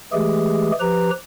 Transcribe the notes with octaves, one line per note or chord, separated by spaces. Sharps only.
E3 G#3 A3 G4 G#4
F3 G4 B4 A#5